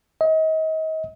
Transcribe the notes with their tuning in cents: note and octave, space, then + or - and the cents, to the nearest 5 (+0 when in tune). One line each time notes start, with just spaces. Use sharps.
D#5 +35